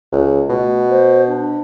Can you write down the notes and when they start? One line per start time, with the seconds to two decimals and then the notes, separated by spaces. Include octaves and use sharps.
0.12 C#2
0.49 B2 A3
0.89 C5
1.27 D4